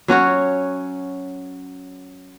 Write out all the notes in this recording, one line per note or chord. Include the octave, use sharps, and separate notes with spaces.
F#3 C#4 F#4 C#5